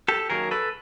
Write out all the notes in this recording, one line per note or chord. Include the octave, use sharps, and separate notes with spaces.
G4 A4
F#2 D#3 F#3 A#3 G#4 A#4
A4 B4